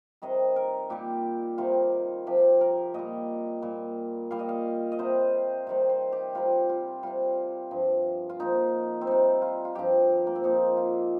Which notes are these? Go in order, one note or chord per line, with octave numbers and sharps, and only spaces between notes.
C3 D#3 G3 D#5
A#4
A#2 G3 G4
C3 D#3 G3 F4
C3 F3 G4
A#4
A#2 G3 D#5
A#2 G3
A#2 G3 F5
D#5
F5
D#5
C3 G3 C5
C3 D#3 G3
C5
G4
C3 G3 F4
F4
C3 G3 F4
G2 F3
F4
A#2 F3 D#4
C4
C3 G3 D#4
F4
F4
G2 F3 G4
A#3
C4
A#2 F3 D#4
F4